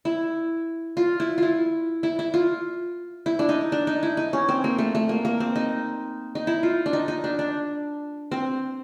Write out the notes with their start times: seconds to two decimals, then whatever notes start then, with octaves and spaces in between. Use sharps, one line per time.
0.05 E4
0.97 F4
1.20 E4
1.38 E4 F4
2.03 E4
2.19 E4
2.34 F4
3.26 E4
3.39 D4
3.49 D#4
3.72 D4
3.87 D#4
4.03 E4
4.17 D#4
4.33 C#4
4.49 C4
4.64 A#3
4.78 A3
4.95 A3
5.09 A#3
5.25 A#3
5.40 C4
5.56 D#4
6.35 D#4
6.47 E4
6.63 F4
6.86 D4
6.93 D#4
7.08 D#4
7.24 D4
7.39 D4
8.31 C4